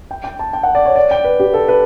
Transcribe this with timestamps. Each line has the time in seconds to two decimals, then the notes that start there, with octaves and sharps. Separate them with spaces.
0.11 G5
0.24 G5
0.39 A5
0.53 G5
0.63 F#5
0.75 D5
0.86 C#5
0.96 D5
1.11 G5
1.24 B4
1.40 G4
1.54 A4
1.68 B4